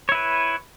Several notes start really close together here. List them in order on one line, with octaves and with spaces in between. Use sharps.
C#5 E4 B4